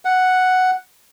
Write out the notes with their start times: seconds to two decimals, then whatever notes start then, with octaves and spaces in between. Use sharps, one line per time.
0.05 F#5